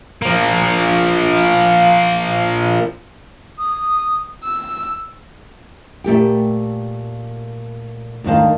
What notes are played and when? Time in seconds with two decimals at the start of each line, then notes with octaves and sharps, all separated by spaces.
0.22 F3 A#3
3.59 D#6
4.45 E6
6.04 A#2 A3 G4 G5
8.24 D2 G#2 D#3 C5 F5 A5